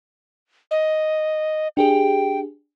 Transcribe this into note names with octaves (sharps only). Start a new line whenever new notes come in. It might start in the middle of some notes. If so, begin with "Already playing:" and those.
D#5
D4 G4 G#4 G5